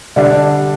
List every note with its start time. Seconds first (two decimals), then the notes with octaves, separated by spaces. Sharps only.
0.16 D3 G3 D4